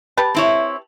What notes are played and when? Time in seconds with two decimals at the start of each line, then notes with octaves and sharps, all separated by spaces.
0.17 G4 B4 A5
0.35 C4 E4 C#5